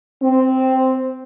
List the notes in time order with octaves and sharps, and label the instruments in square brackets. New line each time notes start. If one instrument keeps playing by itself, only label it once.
[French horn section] C4